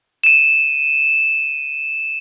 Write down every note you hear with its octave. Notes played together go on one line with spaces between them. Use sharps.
D#7 E7